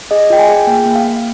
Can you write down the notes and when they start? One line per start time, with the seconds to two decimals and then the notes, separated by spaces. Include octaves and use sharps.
0.11 G#4 D#5
0.30 F4 G5
0.39 G#5
0.49 G#4
0.67 A#3 G5
0.86 A#3
0.96 F5
1.04 A#3